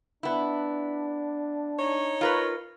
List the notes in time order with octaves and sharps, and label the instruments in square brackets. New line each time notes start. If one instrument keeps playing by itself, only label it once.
[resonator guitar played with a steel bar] B3 E4 [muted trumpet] D4
[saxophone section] D#4 C#5
[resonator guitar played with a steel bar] F4 A#4 B4